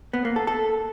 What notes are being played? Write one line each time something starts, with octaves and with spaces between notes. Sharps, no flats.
B3
A#3
A4
A4